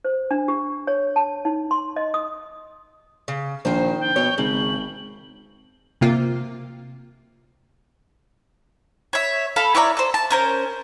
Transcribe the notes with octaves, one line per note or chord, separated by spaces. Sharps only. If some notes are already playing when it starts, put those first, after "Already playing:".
C5
D4
G4
C#5
A5
D#4
C6
D#5
D#6
C#3
A#1 D#3 C5
G5
B2 C#5
G#1 C#3 F#7
C3 A#3 F4
C#5 E5
A4 F5 B5
E4 C#5 D5 A#5
A4 C5
A5
C#4 A#4 C5